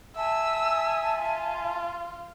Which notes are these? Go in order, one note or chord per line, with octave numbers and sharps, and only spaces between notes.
E5 G#5 A5 E6
F4